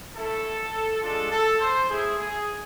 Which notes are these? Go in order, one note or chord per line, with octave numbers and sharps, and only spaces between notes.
A3 E4 A4
G#3 D4 F4 A4
A4
C5
A3 E4 G#4
G#4